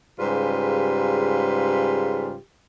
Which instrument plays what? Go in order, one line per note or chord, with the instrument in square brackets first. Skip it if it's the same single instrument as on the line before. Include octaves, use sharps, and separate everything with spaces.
[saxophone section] G#2 C#3 G3 F4 G4 B4